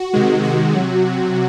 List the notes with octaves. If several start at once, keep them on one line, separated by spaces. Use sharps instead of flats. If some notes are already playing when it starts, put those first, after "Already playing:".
Already playing: F#4
C3 D#3 G#3
F#4
C3 F#3